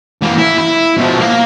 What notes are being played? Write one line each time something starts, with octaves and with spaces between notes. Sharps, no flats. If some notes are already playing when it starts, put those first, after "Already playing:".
E3 A#3
E4
E4
B2 F3
A#3 F5